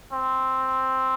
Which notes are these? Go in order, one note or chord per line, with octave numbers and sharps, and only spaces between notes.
C4